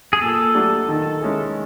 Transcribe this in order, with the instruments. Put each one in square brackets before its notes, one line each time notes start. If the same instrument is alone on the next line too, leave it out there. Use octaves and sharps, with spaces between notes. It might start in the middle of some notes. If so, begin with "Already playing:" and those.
[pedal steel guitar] G#4
[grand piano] A#2 [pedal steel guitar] A4
[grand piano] F#3 A3 D4 G4
D#3
G#3 C#4 E4 G#4